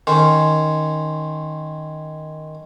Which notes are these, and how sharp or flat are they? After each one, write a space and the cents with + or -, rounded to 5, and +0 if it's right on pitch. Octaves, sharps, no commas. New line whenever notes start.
D#3 +0 C#4 +0 C5 -5